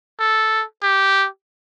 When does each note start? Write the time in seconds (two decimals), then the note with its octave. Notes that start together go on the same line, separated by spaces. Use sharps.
0.20 A4
0.83 G4